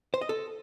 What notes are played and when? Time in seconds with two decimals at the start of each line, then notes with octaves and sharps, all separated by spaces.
0.14 C5
0.21 D#5
0.29 A4